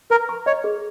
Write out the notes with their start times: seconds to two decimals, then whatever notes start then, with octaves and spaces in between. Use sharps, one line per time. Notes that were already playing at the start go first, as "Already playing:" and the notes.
0.10 A#4 B4
0.29 C#6
0.46 C#5 D#5
0.64 G#4